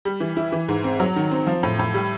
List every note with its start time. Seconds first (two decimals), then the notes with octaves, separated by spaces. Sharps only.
0.05 G3
0.20 E3
0.37 E4
0.52 E3
0.69 G#2
0.84 C4
1.00 F#3
1.16 D#3
1.31 C4
1.47 F3
1.63 A2
1.79 A2
1.94 G3